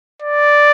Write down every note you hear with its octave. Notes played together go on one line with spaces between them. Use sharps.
D5